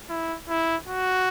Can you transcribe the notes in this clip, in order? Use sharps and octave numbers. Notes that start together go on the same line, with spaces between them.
E4
E4
F#4